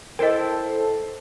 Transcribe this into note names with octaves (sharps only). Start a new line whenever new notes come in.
E4 A4 A#4 C5 D#5 G5